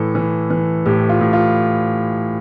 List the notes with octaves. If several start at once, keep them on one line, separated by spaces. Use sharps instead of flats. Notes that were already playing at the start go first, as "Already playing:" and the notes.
Already playing: A2 E3 A4
E3
E3
A2 G4
F4
A2
F4